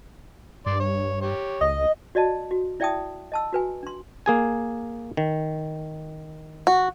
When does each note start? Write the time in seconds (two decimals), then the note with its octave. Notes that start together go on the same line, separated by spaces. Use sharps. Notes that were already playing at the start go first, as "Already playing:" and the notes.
0.66 G2 D5 C6
0.79 C#5
1.21 G4 C#5
1.61 C#2 D#5
2.15 F#4 D5 D#5 A5
2.51 F#4
2.80 E4 D5 E5 G5 A5 D#6
3.32 D#5 A5 E6
3.53 F#4 B4 G#5
3.83 D4 C6
4.26 A#3 G#4 G#5
5.17 D#3
6.67 F#4